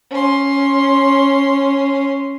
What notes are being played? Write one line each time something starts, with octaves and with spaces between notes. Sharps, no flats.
C#4 C6